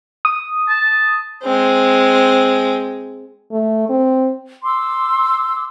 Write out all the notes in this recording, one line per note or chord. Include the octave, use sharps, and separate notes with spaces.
D#6
A5
G#3 C4
A3
C4
C6 D6 E6